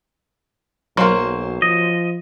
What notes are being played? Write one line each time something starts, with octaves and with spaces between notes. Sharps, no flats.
B1 F#3 A#3 C5 F5 C6
F3 D#5